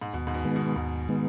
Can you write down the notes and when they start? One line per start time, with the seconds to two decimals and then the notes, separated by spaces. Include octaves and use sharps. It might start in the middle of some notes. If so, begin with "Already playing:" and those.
0.02 G#2
0.13 D#2 B2
0.27 G#2
0.34 B2
0.45 D#3 G#3 B3
0.56 B2
0.76 D#2 G#2
1.09 D#3 G#3 B3